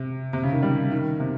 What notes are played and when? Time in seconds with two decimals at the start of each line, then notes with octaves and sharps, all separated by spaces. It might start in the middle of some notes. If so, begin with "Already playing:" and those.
Already playing: C3
0.33 C3
0.43 C#3
0.53 D#3
0.63 G3
0.92 D#3
1.20 C3